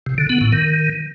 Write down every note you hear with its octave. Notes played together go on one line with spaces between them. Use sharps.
C3
D3
B3
A2
D#3